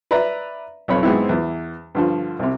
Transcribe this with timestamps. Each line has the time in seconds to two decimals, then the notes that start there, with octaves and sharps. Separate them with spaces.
0.11 B4 D5 E5 A#5
0.88 B1 F2 C#5 B5
1.03 G#2 G#3 B3 C4 E4
1.29 E2 E3
1.95 G2 D3 F3
2.39 C2 C3